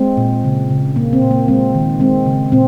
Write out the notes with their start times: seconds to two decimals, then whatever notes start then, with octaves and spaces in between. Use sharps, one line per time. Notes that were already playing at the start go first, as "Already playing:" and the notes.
Already playing: G#3 C4
0.17 A#2
0.45 C#3
0.71 C#3
0.96 A#2 A#3
1.13 C4
1.22 A#2
1.31 A#3
1.48 G#3 C4
1.74 D#3
2.00 G#3 C4
2.26 C#3
2.52 A#2 C4